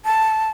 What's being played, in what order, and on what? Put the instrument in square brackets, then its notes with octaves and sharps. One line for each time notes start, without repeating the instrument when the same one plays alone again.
[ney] A5